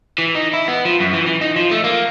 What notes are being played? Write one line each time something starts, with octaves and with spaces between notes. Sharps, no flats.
E3
D#4
E4
B3
F3
F#2
E3
E3
D#4
F3
A3
A#3